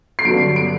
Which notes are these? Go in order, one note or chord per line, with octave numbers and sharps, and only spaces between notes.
C7
G2 D3 F#3 D7
D7